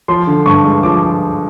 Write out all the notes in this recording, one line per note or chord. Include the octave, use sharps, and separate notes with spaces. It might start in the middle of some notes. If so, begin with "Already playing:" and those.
F3 C6
D3
G2 C#6
G#3
F3 D6